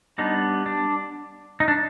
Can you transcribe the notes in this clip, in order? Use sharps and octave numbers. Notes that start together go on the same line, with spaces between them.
G3 B3 D4 D#4
D4
D#4
D4